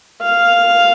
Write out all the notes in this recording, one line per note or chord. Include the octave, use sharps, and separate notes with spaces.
F5